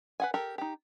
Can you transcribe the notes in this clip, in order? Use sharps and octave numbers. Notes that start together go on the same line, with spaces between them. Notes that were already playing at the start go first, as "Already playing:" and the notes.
B4 F#5 G#5
G4 A4 A#4
D#4 G4